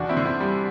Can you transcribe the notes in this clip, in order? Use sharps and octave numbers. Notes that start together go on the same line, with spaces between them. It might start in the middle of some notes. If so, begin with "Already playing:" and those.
Already playing: E2 D4 F#4
C4 E4
D3
C4 E4
G3